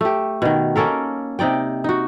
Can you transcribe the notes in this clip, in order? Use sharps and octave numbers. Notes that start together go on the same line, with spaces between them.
A3 G4
B2 D#3
A#3 C#4 A4 A#4
C3 D#4 D5 G5
D#4 F#4